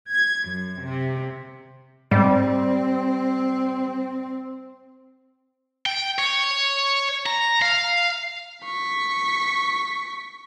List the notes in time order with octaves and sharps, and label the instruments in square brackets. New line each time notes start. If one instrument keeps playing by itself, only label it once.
[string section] G#6
F#2
C3
[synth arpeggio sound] G#2 [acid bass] G3 [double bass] C4
[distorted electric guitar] G5
C#5
A#5
F5
[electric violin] C#6 B6